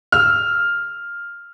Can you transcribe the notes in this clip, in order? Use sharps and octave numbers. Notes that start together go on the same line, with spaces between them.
E6 F6